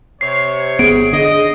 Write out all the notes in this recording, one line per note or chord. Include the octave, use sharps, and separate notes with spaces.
C3 C#5 C7
G1 B3 G#4 D7
D3 D#5